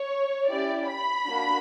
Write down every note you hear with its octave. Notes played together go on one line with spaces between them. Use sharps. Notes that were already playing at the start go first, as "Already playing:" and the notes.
Already playing: C#5
C#4 E4 G4 D5
B5
A#3 D4 F#4